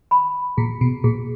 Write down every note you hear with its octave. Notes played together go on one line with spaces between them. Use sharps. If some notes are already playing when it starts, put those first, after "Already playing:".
B5
A#2 G#4
B2
A#2 G#4